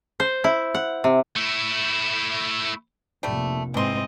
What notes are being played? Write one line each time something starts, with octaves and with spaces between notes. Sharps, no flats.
C5
E4
F#5
C3
A3 E4
F1 A#1 G3 A3
G#2 E3 C4 D#5 C6